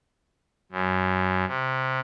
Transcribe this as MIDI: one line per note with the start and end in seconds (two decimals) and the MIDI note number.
0.72 1.45 42
1.47 2.00 48